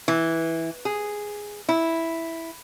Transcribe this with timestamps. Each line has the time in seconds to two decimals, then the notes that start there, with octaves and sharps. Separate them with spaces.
0.08 E3
0.85 G#4
1.69 E4